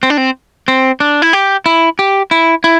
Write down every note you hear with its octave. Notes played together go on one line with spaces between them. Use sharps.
C4
D4
C4
C4
D4
E4
G4
E4
G4
E4
E4